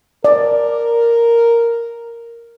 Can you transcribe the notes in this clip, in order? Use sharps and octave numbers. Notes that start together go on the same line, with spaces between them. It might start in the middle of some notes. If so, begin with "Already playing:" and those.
A#4 D5